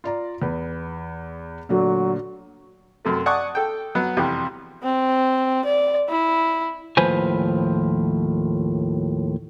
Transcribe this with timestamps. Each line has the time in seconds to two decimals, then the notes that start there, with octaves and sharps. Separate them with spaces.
0.04 F4 D5 A#5
0.42 E2 B4
1.69 A#2 D3 F#3 A3
3.05 F#2 C3 A3
3.26 D5 F#5 G#5 A5 C#6 D#6
3.55 A4 G5
3.95 F#3 B3
4.17 F2 C3 E3 G3
4.83 C4
5.65 D5
6.09 E4
6.97 D#2 A2 F3 B4 C5 G#5